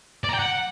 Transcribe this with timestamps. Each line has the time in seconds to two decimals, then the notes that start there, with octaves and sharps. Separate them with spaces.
0.24 D5
0.29 A#5
0.34 G5
0.39 F#5